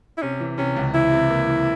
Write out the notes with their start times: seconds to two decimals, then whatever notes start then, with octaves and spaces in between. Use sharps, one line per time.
0.17 E4
0.22 C3 C#4
0.40 E3
0.58 C3 C#4
0.76 C#2
0.94 E3 E4
1.12 C3
1.30 A#3
1.48 E3